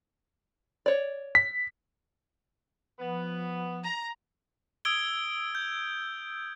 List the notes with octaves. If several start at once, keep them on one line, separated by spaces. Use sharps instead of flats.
C#5 D5
B6
F3 B3
A#5
D#6 E6 G#6 D7 G7
G6